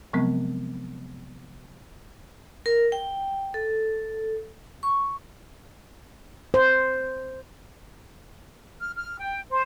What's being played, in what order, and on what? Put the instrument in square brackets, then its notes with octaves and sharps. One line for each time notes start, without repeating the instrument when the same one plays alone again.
[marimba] C3 F3 F#3 G#3 B3 C4
[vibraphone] A#4
G5
A4
C#6
[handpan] C5
[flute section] F6
F6
G5
C5